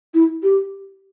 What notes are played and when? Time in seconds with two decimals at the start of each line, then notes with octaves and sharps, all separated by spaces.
0.14 E4
0.43 G4